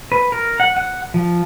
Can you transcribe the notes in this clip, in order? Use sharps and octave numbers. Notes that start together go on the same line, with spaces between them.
B4
A#4
F#5
F#5
F3